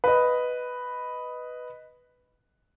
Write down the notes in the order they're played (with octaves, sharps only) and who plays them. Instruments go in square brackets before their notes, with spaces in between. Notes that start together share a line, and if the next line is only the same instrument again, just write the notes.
[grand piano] B4 D#5